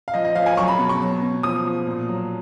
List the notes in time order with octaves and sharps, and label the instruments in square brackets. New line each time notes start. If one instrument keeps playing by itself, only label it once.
[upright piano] F5
F3 D#5
D#5
F3 F5
G#5
F#3 C#6
B5
B2
C#6
F#3
B2
F3 D#6
F3
A#2
F#3